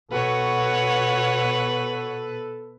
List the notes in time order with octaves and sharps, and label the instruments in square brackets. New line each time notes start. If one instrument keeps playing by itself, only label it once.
[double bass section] B2 [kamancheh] F#4 C#5 [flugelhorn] A4 [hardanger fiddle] B4